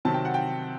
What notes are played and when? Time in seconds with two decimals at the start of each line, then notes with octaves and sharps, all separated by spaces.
0.05 C3 D#3 F#3 C4 A5
0.14 G5
0.25 F#5
0.34 G5